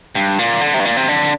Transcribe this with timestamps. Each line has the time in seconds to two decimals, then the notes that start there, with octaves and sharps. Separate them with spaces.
0.15 G2
0.39 A#2
0.61 D3
0.74 C3
0.80 G2
0.85 A#2
0.97 C3
1.09 D3